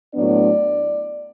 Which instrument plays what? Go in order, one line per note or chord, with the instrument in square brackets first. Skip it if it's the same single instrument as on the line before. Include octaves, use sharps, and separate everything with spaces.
[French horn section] A2 F#3 B3 D4 D5